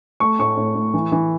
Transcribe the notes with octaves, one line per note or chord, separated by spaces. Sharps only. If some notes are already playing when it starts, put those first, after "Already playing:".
A3 C#6
A2 C#6
A2
A2
E3
E3